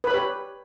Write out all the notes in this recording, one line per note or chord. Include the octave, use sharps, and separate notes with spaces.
G4 B4 C#5 B5